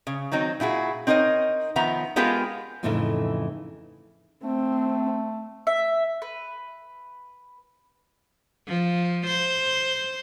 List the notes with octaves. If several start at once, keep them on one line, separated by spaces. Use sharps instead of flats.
C#3
D#3 F#3 C4 D#4
A#2 E4 F#4 G#4
C4 D#4 A#4 C#5 D#5
D#3 F3 B3 E5 A#5
G#3 B3 F4 G4 G#4 A#4
F2 A2 C#3 E3 A3 D#4
A3 C4
E5
B4
F3
C5